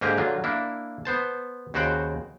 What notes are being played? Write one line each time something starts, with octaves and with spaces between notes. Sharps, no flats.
G#2 D3 A#3 G4 G#4 A#5
D3 F#3 F4
A#3 D4 E4
B3 C5 A5
D#2 C#3 F#4 C5 F#5 G5